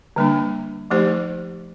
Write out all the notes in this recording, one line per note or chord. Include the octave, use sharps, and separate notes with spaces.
D3 G3 A#3 D4
F3 A3 D#4 G4 C5